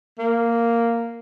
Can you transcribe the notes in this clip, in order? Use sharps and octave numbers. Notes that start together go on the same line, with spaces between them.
A#3